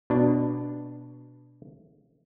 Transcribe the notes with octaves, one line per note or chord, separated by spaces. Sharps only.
B2 D4